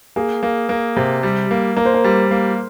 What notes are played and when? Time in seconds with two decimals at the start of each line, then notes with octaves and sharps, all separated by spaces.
0.16 A#3 G#4
0.43 A#3
0.69 A#3
0.96 C3
1.23 G3
1.51 A#3
1.76 A#3 A#4
1.85 C5
1.94 A#4
2.04 G3
2.31 A#3